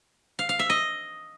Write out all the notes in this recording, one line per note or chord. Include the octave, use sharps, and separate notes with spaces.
F5
F5
E5
D#5